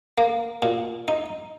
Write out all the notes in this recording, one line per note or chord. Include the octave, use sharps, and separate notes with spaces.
A#3
A#2
D#4